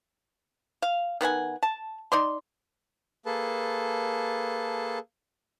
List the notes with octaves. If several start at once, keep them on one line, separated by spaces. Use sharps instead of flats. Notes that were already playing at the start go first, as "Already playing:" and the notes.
F5
D#3 B3 F#5 G#5
A5
D#4 D5 C6
A#3 G#4 A4 B4 A5